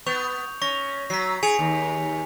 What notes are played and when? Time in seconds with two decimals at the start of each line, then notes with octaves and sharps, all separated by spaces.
0.07 B3 C#6 G6 F7
0.62 C#4 C#6 A#6
1.10 F#3 B6 C7
1.43 G#4 G#5 C#7 F7
1.59 D#2